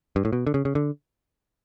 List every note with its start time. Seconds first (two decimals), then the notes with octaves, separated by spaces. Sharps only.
0.16 G2
0.25 A2
0.33 B2
0.47 D3
0.54 C#3
0.65 C#3
0.75 D3